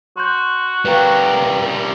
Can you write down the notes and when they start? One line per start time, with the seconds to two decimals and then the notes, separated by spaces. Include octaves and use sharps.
0.17 F#4 C6 G6
0.85 G3 A#4 B4 F5 G5